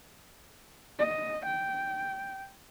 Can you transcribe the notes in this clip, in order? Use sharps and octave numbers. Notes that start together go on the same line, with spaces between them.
D#5
G5